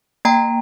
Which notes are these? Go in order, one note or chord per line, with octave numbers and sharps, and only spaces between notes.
A#3 G5 A#5